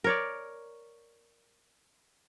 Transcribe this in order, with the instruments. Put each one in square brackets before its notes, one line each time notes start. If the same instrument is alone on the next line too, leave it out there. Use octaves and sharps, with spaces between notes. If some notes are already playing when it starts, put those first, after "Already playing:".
[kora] A#4 C#5 D5